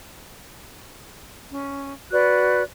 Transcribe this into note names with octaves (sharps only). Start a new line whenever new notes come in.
C#4
F#4 B4 D5 F#6